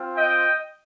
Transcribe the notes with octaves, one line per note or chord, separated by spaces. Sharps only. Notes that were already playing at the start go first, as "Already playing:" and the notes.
Already playing: C4 F4
D#5 G5